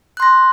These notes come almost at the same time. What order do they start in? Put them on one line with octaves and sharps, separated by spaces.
F#6 C6 A#6